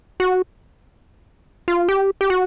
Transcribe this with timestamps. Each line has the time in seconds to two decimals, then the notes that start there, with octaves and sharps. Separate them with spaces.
0.20 F#4
1.68 F4
1.89 G4
2.21 G4
2.30 F#4